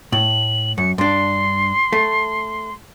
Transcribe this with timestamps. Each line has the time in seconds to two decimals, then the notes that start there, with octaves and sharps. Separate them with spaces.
0.12 A2 F#7
0.78 F#2 C#7
0.98 G2 D4 C6
1.93 A3